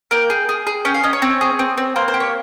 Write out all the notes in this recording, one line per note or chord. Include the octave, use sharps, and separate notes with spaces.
A#3 G5
G#4
G#4
G#4
C#4 G5
F5
C#4 D#5
C#5
C4
G#4
C4
C4
A#3 C5
C5
G4
C#5